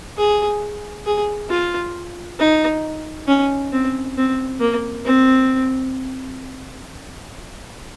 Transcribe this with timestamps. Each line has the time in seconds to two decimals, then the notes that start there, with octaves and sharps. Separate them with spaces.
0.17 G#4
1.06 G#4
1.50 F4
2.39 D#4
3.28 C#4
3.72 C4
4.17 C4
4.60 A#3
5.05 C4